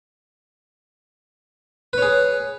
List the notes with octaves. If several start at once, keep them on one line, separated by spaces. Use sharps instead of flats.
G#4 B4 C#5